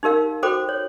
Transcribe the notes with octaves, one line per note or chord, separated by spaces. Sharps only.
D#4 G4 A#4 F5
F#4 A4 C5 G5 B5 D6
C#5